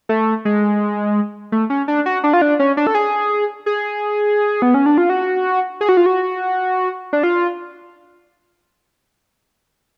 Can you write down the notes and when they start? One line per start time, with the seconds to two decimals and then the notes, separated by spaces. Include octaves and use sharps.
0.09 A3
0.45 G#3
1.52 A3
1.70 C#4
1.88 D4
2.06 F#4
2.24 D4
2.33 F4
2.42 D4
2.59 C#4
2.77 D4
2.87 A4
2.95 G#4
3.66 G#4
4.62 B3
4.74 C#4
4.86 D4
4.98 F4
5.10 F#4
5.81 G#4
5.89 F#4
5.97 F4
6.06 F#4
7.13 D4
7.23 F4